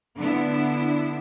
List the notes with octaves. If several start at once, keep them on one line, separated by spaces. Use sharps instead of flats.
D3 B3 D4 E4